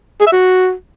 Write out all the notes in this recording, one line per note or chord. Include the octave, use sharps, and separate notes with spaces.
G#4
E5
F#4